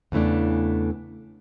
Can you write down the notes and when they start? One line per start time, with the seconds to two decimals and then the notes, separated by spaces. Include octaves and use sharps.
0.12 E2 C#3 E3 A3 D4